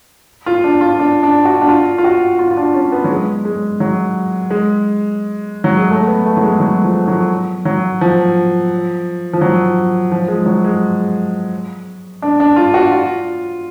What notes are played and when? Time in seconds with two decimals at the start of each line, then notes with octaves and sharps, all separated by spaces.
0.46 F4
0.64 D4
0.81 F4
1.00 D4
1.23 D4
1.45 F#4
1.62 D4
1.69 F4
1.98 F4
2.04 F#4
2.39 F4
2.51 F4
2.57 D4
2.74 C#4
2.92 B3
3.04 F#3
3.10 G#3
3.45 G#3
3.80 F#3
4.50 G#3
5.64 F#3
5.77 G#3
5.91 A3
6.07 B3
6.26 A3
6.37 F#3
6.43 G#3
6.60 F#3
6.84 F3
7.08 F#3
7.65 F#3
8.01 F3
9.33 F3
9.41 F#3
10.12 F3
10.28 G#3
10.46 F#3
10.64 G#3
12.22 D4
12.40 D4
12.56 F4
12.74 F#4
12.91 F4